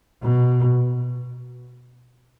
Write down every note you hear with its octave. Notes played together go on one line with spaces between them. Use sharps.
B2